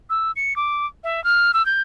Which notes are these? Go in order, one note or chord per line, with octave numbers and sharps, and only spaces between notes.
E6
C#7
D6
E5
F6
E6
G6